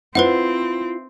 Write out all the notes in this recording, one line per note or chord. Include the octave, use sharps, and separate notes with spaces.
C4 E4 F4 B4 C5 F#5